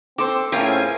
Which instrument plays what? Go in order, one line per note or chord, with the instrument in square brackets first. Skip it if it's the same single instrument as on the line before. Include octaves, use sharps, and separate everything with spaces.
[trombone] C4 [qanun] A4 [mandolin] C5 C6 D6
[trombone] A2 [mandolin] C4 F4 G#4 [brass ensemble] C#4 G#5 [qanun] A#4